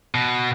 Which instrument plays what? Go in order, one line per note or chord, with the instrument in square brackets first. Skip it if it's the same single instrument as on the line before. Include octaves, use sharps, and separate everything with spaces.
[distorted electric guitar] B2